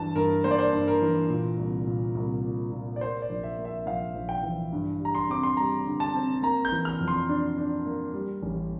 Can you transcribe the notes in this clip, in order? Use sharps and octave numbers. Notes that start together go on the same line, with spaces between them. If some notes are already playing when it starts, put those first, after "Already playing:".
Already playing: G2 E3 A5
G2 A#4
A#3 C5
D5
C5
G2
A#4
E3
A#2
C2
A#2
C2
A#2
A#2
D5
A#3 C5
D5
A#1
E5
A#3
E5
A#1 F5
A#1
G5
E3
G2
G3
A#5
C6
C4 D6
C6
G3 A#5
D3
A5
C4
A#3 A#5
G6
E3
F6
F2
C6
D4
D4
A#3
G3
A1